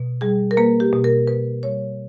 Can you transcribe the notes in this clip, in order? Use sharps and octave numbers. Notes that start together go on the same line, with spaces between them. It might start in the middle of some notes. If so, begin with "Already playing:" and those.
Already playing: B2
G3 G#4
A#4
A#3 B4
G4
B2
A#4
B2 B4
G3 C#5